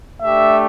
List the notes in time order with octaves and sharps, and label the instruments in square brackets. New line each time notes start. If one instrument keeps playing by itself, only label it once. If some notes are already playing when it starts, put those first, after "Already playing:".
[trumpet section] A3 D4 G4 E5